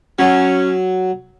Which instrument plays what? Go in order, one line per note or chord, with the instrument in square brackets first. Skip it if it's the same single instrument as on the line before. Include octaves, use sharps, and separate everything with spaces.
[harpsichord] F#3 [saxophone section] C#4